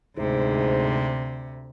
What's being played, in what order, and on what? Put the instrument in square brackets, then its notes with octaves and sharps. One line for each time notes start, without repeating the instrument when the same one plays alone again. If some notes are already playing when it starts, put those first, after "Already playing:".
[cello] D2 C3 [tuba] G#2